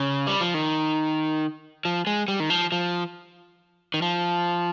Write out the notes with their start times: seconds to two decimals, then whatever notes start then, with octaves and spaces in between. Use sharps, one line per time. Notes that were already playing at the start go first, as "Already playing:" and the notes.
Already playing: C#3
0.27 G3
0.41 F3
0.54 D#3
1.85 F3
2.07 G#3
2.28 G3
2.40 D#3
2.50 F3
2.72 F3
3.94 D#3
4.02 F3